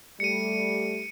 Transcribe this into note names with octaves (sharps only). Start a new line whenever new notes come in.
G3 A3 C#7 D#7